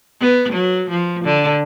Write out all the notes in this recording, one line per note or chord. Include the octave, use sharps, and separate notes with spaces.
B3
F#3
F3
D3